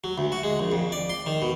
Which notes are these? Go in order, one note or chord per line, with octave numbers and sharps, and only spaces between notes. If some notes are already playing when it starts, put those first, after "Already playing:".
F#3
D2
F#4
G#3
A#1
F2
D5
C6
D#3
B2